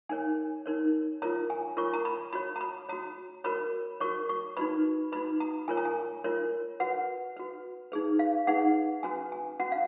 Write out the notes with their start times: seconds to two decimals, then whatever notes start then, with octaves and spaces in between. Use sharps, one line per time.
0.09 D#4 A#4 C#5 G#5
0.66 D#4 A#4 C#5
1.22 F4 A#4 C#5 A#5
1.50 G#5
1.77 F4 A#4 C#5 C#6
1.93 A#5
2.05 B5
2.33 F#4 C#5 B5
2.56 A#5
2.61 B5
2.89 F#4 C#5 A#5
3.44 F#4 A#4 C#5 B5
4.00 F#4 A#4 C#5 C#6
4.29 C#6
4.57 D#4 F#4 B4 B5
5.12 D#4 F#4 B4 B5
5.40 A#5
5.68 F4 A#4 C#5 G#5
5.77 A#5
5.85 G#5
6.24 F4 A#4 C#5
6.80 F#4 B4 F#5
7.36 F#4 B4
7.92 D#4 G#4 B4
8.19 F5
8.47 D#4 G#4 B4 F#5
9.03 C#4 F#4 B4 G#5
9.32 G#5
9.59 C#4 F#4 B4 F#5
9.72 F5